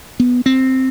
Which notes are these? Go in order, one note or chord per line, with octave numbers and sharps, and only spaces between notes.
B3
C4